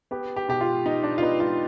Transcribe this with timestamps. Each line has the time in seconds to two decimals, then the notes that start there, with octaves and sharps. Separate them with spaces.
0.11 B3 G4
0.36 G4
0.49 B2 G4
0.61 F4
0.86 B2 D#4
1.03 D4
1.18 F4
1.22 B3 D#4
1.40 F4